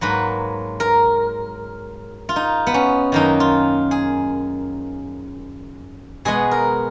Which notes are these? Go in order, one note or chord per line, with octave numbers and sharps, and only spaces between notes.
G#2 F#3 A#3 B4
A#4
F4
D#4
B3
C#4
F#2 D#3 A#3 D#4
F4
G#4
B2 G#3 B3 G#4
A#4